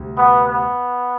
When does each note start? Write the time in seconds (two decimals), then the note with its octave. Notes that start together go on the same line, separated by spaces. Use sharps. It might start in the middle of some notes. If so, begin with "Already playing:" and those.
Already playing: D2 C3 G3
0.18 B3
0.46 B3